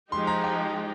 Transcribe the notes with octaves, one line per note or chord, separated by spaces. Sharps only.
F3 G#3 D#4 G4 C6
A#5
G5